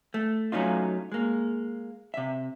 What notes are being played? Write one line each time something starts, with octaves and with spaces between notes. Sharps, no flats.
A3
F#3 A3 C#4 D#4 F4
G#3 A#3
C3 E5